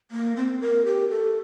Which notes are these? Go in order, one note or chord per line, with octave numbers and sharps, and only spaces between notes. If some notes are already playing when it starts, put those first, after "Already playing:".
A#3
C4
A#4
G4
A4